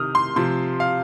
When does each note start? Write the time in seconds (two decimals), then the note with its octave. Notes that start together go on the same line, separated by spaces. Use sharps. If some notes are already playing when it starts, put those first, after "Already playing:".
Already playing: C3 D#3 D#6 F6
0.15 C6
0.36 C3 F3 C6
0.80 F5